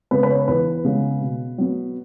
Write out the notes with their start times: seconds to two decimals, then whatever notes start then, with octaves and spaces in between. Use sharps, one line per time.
0.11 C#3 G#3 B3 B4
0.23 B4
0.30 C#5
0.48 E2 B4
0.84 C#3 G#3 B3
1.21 B2
1.58 F#3 B3